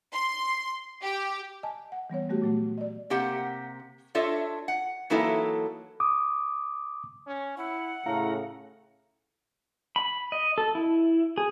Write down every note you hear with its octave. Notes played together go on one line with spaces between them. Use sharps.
C6
G4
D#5 G#5 A5
F#5
E3 G3 B3 C#5
G3 A3 F#4 G4
A#2 F#3 A3
D5 D#5
C3 A#3 G4 F#5
D4 F4 A4 C#5 D#5 E5
F#5
E3 F#3 A#3 D#4 E4 A4
D6 D#6
C#4
E4 F#5
A2 C#3 A3 E4 F5 A#5
B5
D#5
A4
E4
G#4